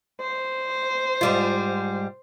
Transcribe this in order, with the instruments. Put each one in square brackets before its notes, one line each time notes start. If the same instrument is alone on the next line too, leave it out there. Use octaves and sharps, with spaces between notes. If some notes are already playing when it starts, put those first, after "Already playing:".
[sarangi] C5
[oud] G#2 G3 F4